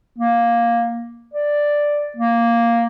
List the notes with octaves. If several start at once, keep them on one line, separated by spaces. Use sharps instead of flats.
A#3
D5
A#3